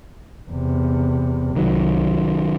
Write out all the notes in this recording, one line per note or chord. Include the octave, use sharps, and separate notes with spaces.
E2 C3
C2 D#3 F#3